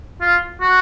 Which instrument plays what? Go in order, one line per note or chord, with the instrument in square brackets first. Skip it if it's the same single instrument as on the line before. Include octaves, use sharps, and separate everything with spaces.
[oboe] F4
F#4